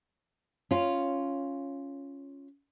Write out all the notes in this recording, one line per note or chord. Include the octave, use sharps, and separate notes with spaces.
C#4 F4